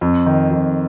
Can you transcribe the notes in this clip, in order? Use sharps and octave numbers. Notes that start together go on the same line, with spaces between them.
F2
D#3
F2